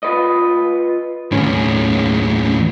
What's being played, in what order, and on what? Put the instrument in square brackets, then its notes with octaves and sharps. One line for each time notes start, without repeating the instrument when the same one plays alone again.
[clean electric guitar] F4 B4 D#5
[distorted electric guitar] D#2 A2 [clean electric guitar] C#3 C#4